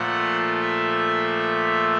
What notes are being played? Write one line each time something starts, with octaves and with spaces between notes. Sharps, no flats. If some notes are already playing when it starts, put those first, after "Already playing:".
Already playing: A#2 F3 A3 F#5
E5